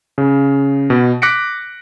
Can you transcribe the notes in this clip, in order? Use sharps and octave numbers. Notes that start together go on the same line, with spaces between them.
C#3
B2
D6 F#6 A#6 B6 C#7 D7